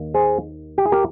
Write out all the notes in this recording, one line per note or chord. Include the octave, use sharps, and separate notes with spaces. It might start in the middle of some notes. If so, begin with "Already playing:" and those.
Already playing: D#2 D#3 A#3
G#4 C5
G4
G#4
G4 A#4